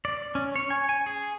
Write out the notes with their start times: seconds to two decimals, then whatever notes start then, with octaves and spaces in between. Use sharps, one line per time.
0.05 D5
0.35 C#4
0.56 C#5
0.70 G#5
0.89 G#5
1.06 G#4